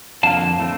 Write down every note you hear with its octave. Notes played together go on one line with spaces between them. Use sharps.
F2 D3 F3 A#3 F5 A5
A2 A3 C4